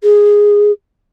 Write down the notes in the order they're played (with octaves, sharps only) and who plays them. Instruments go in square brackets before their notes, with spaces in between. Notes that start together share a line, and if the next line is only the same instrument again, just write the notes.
[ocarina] G#4